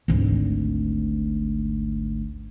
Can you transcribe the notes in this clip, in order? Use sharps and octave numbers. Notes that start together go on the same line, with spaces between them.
G#1 D2